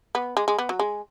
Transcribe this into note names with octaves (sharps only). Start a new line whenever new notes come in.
B3
G#3
G#3
B3
F#3
G#3